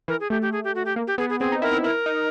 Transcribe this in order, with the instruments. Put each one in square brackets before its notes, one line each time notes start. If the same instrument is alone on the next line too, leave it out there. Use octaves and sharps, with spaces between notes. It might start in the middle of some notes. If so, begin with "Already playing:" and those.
[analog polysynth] E3 [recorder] A#4
[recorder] G#4
[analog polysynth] A3 [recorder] G4
[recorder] G4
G#4
G4
F#4
G4
[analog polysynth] A#3
[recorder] G4
[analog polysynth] B3 [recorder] G#4
[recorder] G#4
[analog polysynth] C4 [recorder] G#4
[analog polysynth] D#4
[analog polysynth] E4 [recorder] A#4
[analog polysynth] E4
[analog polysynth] E4 [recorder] A#4
[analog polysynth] D#4